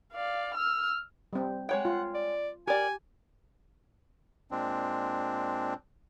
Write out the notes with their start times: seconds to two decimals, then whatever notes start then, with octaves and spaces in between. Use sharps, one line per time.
0.13 D5 F5
0.55 E6 F6
1.33 G3 C4
1.69 G#3 C#5 F#5 G5
1.85 F4
2.15 D5
2.68 G4 A#4 D5 G#5
4.51 A#2 G#3 C4 D4